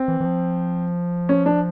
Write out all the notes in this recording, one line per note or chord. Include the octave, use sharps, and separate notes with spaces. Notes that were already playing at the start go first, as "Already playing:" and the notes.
Already playing: C4
E3
E3
F3
C#4
D4